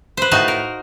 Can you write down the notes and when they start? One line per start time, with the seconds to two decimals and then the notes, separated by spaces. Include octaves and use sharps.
0.17 B4 C5
0.31 A2 D#4 F#4 F5 A5
0.48 A#4